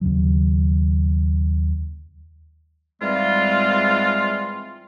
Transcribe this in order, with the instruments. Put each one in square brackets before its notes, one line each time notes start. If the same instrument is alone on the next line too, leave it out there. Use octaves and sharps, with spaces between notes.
[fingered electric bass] D#2 C#3 F#3
[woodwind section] G#2 E3 G3 G#3 C4 F4